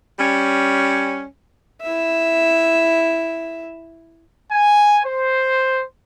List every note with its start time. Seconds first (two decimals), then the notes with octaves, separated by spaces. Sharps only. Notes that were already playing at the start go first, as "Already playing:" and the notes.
0.19 G3 C#4
1.82 E4 E5
4.52 G#5
5.05 C5